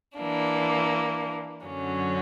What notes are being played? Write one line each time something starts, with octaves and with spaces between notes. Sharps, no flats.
E3 A#3 D4
F#2 D3 F#3 C#4